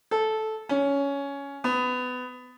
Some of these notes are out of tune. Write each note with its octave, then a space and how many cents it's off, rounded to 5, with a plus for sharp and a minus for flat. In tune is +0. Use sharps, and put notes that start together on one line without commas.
A4 -10
C#4 +15
B3 +25